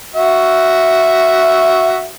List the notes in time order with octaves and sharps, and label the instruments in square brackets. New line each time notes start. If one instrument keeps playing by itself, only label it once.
[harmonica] F#4 E5